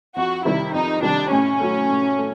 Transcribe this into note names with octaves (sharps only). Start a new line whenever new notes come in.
F2 F#4
C3 D#3 G3 E4
F2 D#4
C3 D#3 G3 D4
A2 C#4
F#3 A3
A2
A3